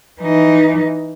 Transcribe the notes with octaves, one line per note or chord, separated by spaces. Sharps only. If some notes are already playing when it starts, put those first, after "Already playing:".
E3 D#4